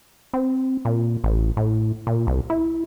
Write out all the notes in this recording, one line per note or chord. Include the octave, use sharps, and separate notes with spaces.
C4
A#2
A1
A2
A#2
C2
E4